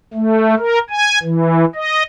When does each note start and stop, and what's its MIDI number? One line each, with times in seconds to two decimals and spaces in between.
0.13 0.55 57
0.59 0.79 70
0.90 1.19 80
1.23 1.65 52
1.75 2.03 75